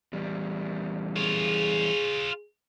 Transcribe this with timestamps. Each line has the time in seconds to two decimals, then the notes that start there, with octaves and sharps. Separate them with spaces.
0.13 E2 G3
1.16 F4 G#4 C#5